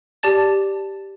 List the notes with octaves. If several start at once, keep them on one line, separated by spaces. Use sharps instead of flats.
G4 D5 A5 A6